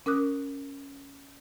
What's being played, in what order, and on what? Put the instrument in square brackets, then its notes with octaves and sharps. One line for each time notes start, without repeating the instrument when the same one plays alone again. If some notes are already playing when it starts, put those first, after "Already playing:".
[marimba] C#4 A#4 D6 D#6 F#6